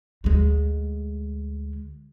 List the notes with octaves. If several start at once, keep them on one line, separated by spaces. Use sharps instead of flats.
D2 G#3